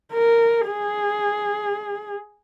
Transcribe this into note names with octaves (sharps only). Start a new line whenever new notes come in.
A#4
G#4